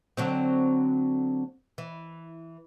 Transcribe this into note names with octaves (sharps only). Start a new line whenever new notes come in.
D3 F#3 C4
E3